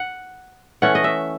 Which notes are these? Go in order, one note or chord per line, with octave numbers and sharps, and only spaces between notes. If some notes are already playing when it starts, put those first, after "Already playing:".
Already playing: F#5
E3 A3 C#4 F#5
D#5
E5